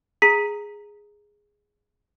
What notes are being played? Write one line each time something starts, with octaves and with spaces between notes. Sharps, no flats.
G#4 A#5 B6 D#7